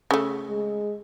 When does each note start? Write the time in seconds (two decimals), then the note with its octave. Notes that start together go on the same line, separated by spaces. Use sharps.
0.11 C#3 A3
0.49 G#3